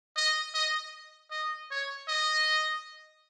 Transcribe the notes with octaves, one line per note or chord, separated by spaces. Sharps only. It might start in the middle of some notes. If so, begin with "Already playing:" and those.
D#5
D#5
D#5
C#5
D#5